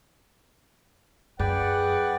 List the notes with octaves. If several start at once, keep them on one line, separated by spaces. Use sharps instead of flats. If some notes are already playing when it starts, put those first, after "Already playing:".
F#2 G#4 B4 D5 F#5 G5